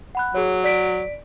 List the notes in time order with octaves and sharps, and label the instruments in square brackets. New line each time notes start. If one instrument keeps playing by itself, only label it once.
[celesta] F#5 B5 F#6
[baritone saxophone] F#3 [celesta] G#4 C#5
[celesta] D5 B6 D7